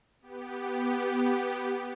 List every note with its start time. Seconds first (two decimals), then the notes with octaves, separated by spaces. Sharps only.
0.22 B3 G4